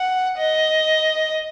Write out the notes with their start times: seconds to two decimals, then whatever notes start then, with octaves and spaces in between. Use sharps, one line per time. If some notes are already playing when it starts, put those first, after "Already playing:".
Already playing: F#5
0.37 D#5